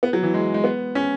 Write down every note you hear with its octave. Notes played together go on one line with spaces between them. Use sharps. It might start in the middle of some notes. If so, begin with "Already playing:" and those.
B3
F#3
E3
G#3
G#3
B3
C#4